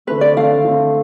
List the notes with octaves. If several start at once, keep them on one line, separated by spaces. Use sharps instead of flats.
D3 A3 C4 B4
D5
D3 A3 C4 F5
D3 A3 C4